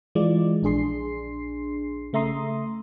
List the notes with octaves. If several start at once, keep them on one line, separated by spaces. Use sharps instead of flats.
E3 G#3 F4 D5
A#1 D4 G#4 C6 C7
C#3 A3 E5 A#5 C6 D#6